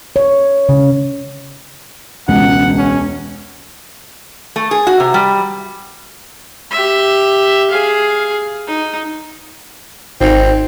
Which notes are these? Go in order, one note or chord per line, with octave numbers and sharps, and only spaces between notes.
C#5
C#3
E1 C#2 F#5
C#4
A3
G#4
F#4
C3
G3
G4 E5
G#4 F5
D#4
G#1 C4 D#4